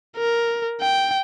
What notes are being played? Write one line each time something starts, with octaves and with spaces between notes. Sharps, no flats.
A#4
G5